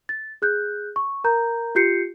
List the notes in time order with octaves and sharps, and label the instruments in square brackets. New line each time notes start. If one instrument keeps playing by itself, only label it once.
[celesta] A6
G#4 F#6 G6
C#6
A#4 A#5 G6
F4 G4 G6 C7 C#7